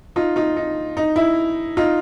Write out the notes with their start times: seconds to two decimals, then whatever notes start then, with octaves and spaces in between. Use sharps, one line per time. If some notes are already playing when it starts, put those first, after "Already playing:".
0.16 D#4 F4
0.36 D#4 F4
0.57 D#4
0.97 D#4
1.16 E4
1.77 D#4 F4